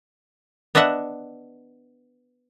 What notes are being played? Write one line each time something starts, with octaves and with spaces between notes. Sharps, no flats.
B3 D4 D#5 E5 F#5